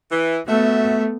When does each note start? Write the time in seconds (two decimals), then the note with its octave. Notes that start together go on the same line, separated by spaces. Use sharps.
0.11 E3
0.48 A3 B3 F#4 A4 E5